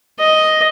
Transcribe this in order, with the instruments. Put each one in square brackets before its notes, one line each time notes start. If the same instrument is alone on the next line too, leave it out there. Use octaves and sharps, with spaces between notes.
[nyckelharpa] D#5